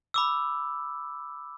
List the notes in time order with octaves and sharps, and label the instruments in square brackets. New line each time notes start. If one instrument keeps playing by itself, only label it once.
[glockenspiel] B5 D6 E6